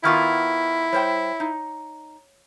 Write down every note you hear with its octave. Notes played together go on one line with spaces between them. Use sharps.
D#3 B3 E4 F4 C#6 F6 G#6
G3 C5 C#5 G5
D#4